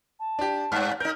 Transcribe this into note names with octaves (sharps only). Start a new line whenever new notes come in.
A5
D4 G4
G2 F6
D#4 A#4 G6